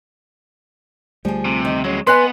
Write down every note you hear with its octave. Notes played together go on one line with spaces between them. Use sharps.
D2 F3 G3 A3 G#4
C3
D#3
F#3 G#3 C#4
B3 B4 D#5 G#5 C6 F#6